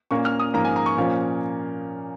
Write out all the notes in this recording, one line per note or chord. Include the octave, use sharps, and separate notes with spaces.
A#2 A#3 C#4 C#6
F6
D#6
G#2 F3 A#3 C#4 A#5
G#5
A#5
C#6
A#2 F3 A#3 C#4